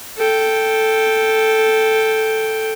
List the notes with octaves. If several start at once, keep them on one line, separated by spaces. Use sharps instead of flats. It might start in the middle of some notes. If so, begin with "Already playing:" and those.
A4 G5